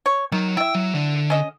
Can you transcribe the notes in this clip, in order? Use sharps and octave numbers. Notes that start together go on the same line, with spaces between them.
C#5
D#3 F#3
E4 E5 G5
F#3
D3
C#4 D#5